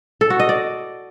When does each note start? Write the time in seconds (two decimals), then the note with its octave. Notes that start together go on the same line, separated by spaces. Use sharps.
0.21 A4
0.30 F#4
0.40 D#5
0.49 D5